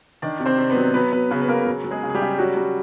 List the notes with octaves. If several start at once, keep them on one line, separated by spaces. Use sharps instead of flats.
D#3 D4 D5
C3
C4 C5
C3
B3 B4
F#3
F#3 B3 B4
F#3 B3 B4
C#3 B3 B4
B4
C#3 A#3 A#4
F#3
F#3
G#3 G#4
C#3
G#4
G3 G4
C#3
F#3 G3 F#4
G3